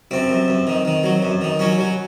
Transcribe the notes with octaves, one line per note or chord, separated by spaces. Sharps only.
F#2 C4
F#2
F#2
D#3
D#3
F#3
F#2
D#3
F#3 C#4
F#3